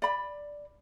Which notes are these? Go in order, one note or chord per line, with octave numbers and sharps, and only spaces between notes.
D5 B5